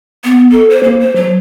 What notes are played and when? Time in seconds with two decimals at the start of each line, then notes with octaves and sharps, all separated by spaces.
0.24 B3
0.52 A4
0.70 C5
0.83 A#3
1.00 C5
1.16 F#3